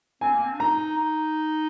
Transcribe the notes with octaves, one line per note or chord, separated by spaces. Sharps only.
C4 G#5
A#3
C4
D4
D#4 A#5
D#4